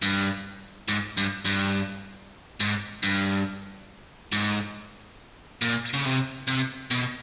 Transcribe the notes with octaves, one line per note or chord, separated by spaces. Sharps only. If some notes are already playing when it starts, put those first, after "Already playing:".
G2
G#2
G2
G2
G#2
G2
G#2
A#2
C#3
C3
C3
B2